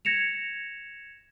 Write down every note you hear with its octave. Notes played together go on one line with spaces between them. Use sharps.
G#6 A#6 C#7 E7 F7